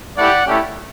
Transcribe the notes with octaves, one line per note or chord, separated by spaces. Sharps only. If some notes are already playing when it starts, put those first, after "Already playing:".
A3 E4 G4 D5 F#5
A3 C#4 E4 G4